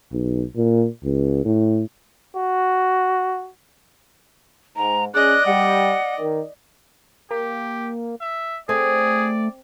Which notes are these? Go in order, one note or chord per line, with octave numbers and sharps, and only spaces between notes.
B1
A#2
C#2
A2
F#4
G#2 A#5
C#4 G#4 D5 D#5 F#6
G3 F#5
D#3
A#3 G4
E5
A3 C4 G#4 D5